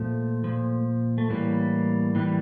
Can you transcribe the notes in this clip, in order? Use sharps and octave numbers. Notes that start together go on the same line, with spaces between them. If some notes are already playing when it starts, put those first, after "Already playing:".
Already playing: A#2 F3 A3
A#2 F3
A3
A2 E3 G3 A#3
A2 E3 G3